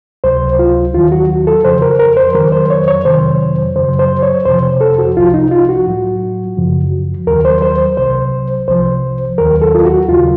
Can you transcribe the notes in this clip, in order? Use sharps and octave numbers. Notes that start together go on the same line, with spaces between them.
C#2 C3 F#3 C5
F4
D#2 D#3 F#3 F4
F#4
A4
F2 C#3 F3 C5
A#4
A#4
C5
F2 D#3 F#3 A#4
C5
C#5
C#5
F2 C3 D#3 F#3 C5
F#2 C#3 F#3 C5
C5
C#5
F2 C3 F3 C5
A4
F#4
C2 C3 F3 F4
D#4
F4
F#4
A2 F#3
F#2 C#3 F3
D#2 D#3 F#3 A#4
C5
C5
C2 C3 F#3 C5
C2 C3 F3 C5
D#2 D#3 F#3 A#4
A4
F4
F#4
D#2 C#3 F#3 F4